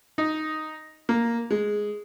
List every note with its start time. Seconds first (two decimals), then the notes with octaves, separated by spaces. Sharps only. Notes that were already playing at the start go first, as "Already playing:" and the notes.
0.18 D#4
1.09 A#3
1.51 G#3